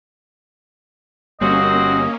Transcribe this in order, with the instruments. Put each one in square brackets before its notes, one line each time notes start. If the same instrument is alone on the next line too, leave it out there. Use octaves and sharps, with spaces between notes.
[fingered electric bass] G1 G3 [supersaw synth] A#3 C#4 [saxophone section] C4 F#4 [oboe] D#5